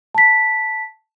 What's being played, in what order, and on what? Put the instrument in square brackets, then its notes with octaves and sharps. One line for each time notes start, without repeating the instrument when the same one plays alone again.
[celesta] A5 B6